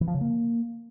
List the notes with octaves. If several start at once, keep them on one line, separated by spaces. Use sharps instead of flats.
E3
F3
C#3
A#3